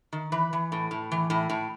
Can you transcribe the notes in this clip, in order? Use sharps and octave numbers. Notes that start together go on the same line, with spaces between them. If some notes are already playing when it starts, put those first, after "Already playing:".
D#3
E3 B4
E3
A2
A2
E3
A2
A2